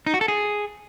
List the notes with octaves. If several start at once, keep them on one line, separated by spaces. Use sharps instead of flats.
D#4
F#4
A4
G#4